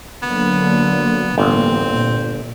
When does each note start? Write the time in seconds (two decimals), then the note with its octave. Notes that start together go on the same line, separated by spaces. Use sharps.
0.23 D3 F#3 A#3 B3
1.38 G1 A2 E3 A#3 C4
1.91 A#2